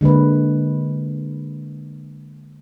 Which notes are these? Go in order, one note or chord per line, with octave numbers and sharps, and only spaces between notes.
D3 G#3 A#3 B4